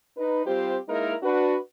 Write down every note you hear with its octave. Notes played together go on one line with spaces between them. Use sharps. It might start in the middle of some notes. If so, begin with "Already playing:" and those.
D#4 B4
G3 C4 F4 G4 C5
G#3 A#3 D#4 E4 A#4
D4 F#4 B4